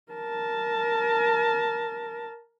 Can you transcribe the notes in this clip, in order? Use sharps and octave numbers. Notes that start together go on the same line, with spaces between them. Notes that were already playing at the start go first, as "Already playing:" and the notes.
A#4 A5